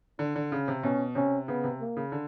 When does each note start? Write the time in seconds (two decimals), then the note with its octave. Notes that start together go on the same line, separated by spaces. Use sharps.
0.19 D3 D4
0.36 D3
0.51 C#3 C#4
0.68 C3
0.83 B2 C#4
1.15 C3 C#4
1.48 C#3 B3
1.64 C3
1.81 A#3
1.97 C#3
2.12 D3